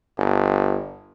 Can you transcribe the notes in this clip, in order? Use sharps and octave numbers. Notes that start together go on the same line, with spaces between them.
G1